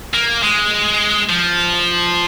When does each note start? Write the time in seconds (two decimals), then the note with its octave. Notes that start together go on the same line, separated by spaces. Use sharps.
0.14 A#3
0.43 G#3
1.30 F3